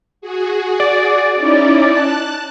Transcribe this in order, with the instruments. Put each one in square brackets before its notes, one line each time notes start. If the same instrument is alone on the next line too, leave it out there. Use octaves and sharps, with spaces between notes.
[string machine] F#4 G#4
[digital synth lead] D5
[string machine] C#4 D#4 E4
A5 F#6